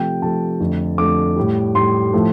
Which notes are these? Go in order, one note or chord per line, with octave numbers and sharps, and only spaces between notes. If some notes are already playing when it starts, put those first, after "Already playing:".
Already playing: C3 F3 A3 G5
C3 F3 A3 A5
F2 D3 A3
F2 D3 A3 D6
A2 G3
A2 G3 C6
A2 F3 A3